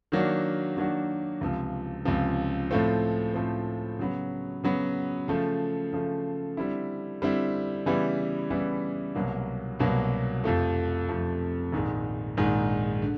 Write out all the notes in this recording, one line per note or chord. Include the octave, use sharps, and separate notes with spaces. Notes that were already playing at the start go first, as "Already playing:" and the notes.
D#3 F#3 A#3 D4 F#4
D#3 F#3 A#3 D4 F#4
C#2 C3 F3
C#2 C3 F3
A2 F3 A3 C4
A2 F3 A3 C4
C#3 F#3 B3
C#3 F#3 B3
C#3 F3 A3
C#3 F3 A3
D3 G3 C4 E4
D3 G3 C4 E4
C#3 E3 G3 B3 E4
C#3 E3 G3 B3 E4
C2 B2 F#3 A#3
C2 B2 F#3 A#3
F2 C3 F3 A3
F2 C3 F3 A3
A#1 G#2 D#3 G#3
A#1 G#2 D#3 G#3
D3